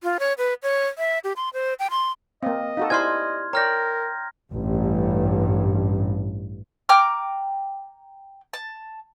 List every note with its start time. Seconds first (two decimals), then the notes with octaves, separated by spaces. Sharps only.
0.03 F4
0.20 C#5
0.38 B4
0.63 C#5
0.98 E5
1.24 G4
1.37 C6
1.53 C5
1.79 G5
1.91 C6
2.43 A#3 C4 D#5 F5
2.77 D#4 F#4 A4 F5
2.90 E4 G4 C5 D5 G#5 C6 F6 G#6
3.53 A#4 C#5 D5 G5 A#5 F6 G6 A#6
4.52 A1 G2
6.89 G5 A#5 D6 F6
8.53 A5